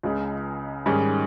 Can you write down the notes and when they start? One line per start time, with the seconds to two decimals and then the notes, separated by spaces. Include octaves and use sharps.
0.03 C#2 C#3 G#3
0.86 G#2 D#3 G3 C#4 G#4